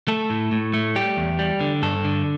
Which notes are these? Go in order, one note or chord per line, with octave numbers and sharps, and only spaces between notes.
A3 A4
A2
A2
A3
G3 G4
E2
G3
D3
G2 A4
D3